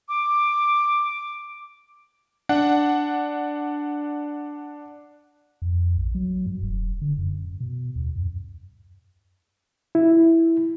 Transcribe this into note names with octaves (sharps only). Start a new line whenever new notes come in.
D6
D4 F#5
F2
A#1
F#3
G2
E1
D3
F#2
B2
D#2
F#2
E4